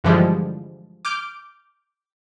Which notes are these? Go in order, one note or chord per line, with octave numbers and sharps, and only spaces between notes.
G2 D3 E3 F3 G3 G#3
D6 F6 G6 D7